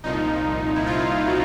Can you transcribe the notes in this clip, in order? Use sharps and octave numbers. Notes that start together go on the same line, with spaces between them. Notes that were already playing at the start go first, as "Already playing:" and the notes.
C2 A#2 F3 D#4
E4
C2 A#2 F3 F4
F#4